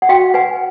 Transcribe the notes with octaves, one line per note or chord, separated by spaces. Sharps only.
F#5
F#4 F5 G5
B4 F#5 G#5